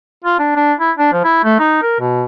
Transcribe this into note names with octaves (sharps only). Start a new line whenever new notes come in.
F4
D4
D4
E4
D4
F3
E4
A3
D#4
A#4
B2